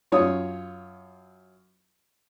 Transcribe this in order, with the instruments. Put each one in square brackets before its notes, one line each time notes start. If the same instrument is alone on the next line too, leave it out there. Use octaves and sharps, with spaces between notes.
[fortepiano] F#2 F4 C#5 D#6